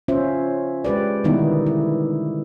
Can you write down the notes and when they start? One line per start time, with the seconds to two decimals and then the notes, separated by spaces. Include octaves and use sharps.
0.08 C#4 F4 C5 E5
0.84 G#3 G4 B4 D5
1.24 D3 D#3 G3 B3 D#4 E4
1.66 E4